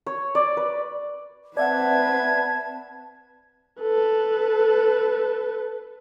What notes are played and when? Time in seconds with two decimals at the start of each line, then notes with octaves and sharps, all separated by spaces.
0.06 C#5
0.35 D5
0.57 B4
1.57 C4 B4 D5 E5 F#5 A5 G#6
3.81 A4 B4